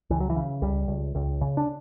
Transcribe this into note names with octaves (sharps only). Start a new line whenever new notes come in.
C#2 E3
F#3
E3
C#3
C#2 G3
C#2
C#2
C#3
D4